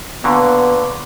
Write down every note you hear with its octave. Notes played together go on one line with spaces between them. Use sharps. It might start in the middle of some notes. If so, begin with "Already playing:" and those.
A#2 D3 B3 C#6 D6